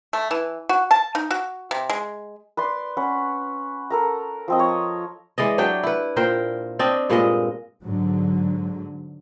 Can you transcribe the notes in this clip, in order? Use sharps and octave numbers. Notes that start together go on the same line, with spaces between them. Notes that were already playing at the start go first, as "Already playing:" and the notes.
A3
E3
F#4
A5
D#4
F#4
C3
G#3
B4 D5 C6
C#4 B4 F#5
A4 A#4 A#5
F3 C4 D#5
C#5
E3 G#3 D5 D#5
F#3 D4 G4 G5
E4 B4
A#2 A#4 C5 G5
C4 D4 D5 D#5
G2 A#2 G#3 D#5
G#2 D3 F#3